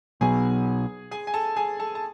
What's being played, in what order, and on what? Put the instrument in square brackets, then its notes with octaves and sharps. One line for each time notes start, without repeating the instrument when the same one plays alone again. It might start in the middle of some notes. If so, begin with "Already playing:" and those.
[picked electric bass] B1 B2 F#3 B3 [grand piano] G#4 G#5
[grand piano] G#4 G#5
G#5
A4 A5
G#4 G#5
A4 A5
A5